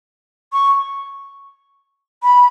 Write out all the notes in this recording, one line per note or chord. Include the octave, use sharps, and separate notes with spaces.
C#6
B5